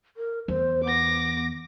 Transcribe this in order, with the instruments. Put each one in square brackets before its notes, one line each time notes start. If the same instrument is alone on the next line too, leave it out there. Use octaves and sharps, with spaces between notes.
[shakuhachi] A#4
[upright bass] E2 [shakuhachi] C5
[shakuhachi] B3 [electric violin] D6 A#6